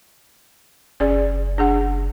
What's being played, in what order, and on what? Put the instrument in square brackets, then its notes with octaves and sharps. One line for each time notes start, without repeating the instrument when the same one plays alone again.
[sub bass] F#1 [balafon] C#4 G#4 D5
[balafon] D4 G#4 F#5